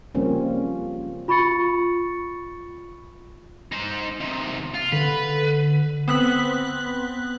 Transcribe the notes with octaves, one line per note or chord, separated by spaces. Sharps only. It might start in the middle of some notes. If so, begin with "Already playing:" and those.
C#3 F3 G3 A#3 C4 C#4
F4 B5 C#6 A6 C#7
D#4 C5
C3 D#3
F4
D3 B4
B3 C4 F#6 B6 F#7